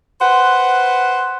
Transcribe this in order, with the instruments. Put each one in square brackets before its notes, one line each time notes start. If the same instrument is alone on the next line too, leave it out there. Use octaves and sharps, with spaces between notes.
[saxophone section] B4 C5 F#5